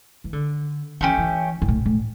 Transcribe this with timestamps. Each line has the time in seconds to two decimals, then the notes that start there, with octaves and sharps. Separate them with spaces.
0.24 E3
0.33 D3
1.01 E3 A3 C#4 G4
1.18 E3
1.62 G2
1.68 A2
1.86 A2